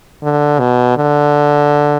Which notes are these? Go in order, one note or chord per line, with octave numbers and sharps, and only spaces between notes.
D3
B2
D3